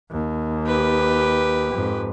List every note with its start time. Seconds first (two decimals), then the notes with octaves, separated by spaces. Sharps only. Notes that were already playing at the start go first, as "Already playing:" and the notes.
0.11 D#2
0.66 G4 B4
1.74 F2 G#2